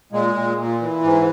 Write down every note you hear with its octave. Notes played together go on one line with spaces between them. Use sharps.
A#2 G#3
A#2
A#2
E3
G#2